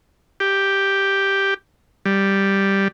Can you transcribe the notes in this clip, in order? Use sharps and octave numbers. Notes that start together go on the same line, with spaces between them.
G4
G3